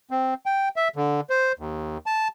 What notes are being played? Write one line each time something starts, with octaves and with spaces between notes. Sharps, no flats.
C4
G5
E5
D3
C5
D#2
A5